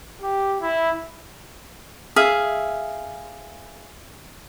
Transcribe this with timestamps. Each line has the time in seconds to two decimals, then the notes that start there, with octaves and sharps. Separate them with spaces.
0.21 G4
0.61 E4
2.16 G#4 E5 F5